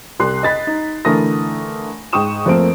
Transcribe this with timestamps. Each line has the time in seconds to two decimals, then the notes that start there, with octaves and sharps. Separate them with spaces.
0.20 C2 C6 F#6 C7
0.43 D#5 B5 A6 B6
0.67 D#4
1.05 D3 E3 A3 A#4 D#6 A#6
2.13 G#2 G5 C#6 D#6 E7
2.46 F2 A3 A#3 C4 A#4 D7